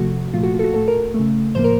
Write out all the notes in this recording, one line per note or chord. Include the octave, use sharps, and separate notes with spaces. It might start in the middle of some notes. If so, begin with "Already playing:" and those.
Already playing: C3 F3 A3 F#4
A#2 F3 A3 F4
F#4
F4
A4
F#4
A2 A3 A4
A#4
A3
C#3
A2 F3 A#3 C5
A#4